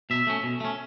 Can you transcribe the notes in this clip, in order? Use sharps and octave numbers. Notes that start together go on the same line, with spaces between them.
B2 E5
A3 C#4
B2
A3 C#4